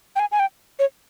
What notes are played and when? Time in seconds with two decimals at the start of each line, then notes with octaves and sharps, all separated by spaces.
0.16 G5
0.19 G#5
0.32 G#5
0.39 G5
0.79 C#5